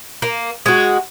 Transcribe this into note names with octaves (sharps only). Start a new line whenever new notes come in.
A#3
G#3 F#4